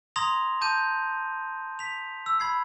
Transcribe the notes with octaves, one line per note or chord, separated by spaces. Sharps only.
A#5 C6 D#6 G#6 A#6 F7
A5 D6 G6 D#7
B6 F7
E6
B5 G#6 C7